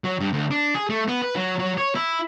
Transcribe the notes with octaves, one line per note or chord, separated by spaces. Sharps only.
F#3
G2
D2
D4
G#4
A3
B3
B4
F#3
F#3
C#5
E4